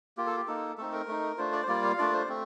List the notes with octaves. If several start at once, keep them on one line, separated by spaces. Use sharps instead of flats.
A#3 F4 G4
A4
G4
A#3 D#4 A4
A3 C4 D#4 A4
A#4
A3 D#4
A3 D4 F4 C5
D5
C5
G3 A#3 F4 D5
F5
A3 D4 F4 D5
C5
A3 C4